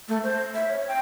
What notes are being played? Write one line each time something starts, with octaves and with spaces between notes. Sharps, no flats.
A3
C5
E5
C#5
G5